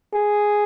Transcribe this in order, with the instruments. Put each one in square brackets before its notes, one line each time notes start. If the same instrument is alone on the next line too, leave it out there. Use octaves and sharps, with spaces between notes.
[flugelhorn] G#4